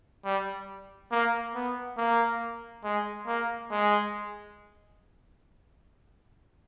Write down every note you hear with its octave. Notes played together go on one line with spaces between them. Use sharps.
G3
A#3
B3
A#3
G#3
A#3
G#3